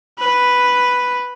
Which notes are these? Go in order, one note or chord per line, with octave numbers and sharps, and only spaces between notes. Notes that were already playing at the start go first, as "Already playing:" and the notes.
B4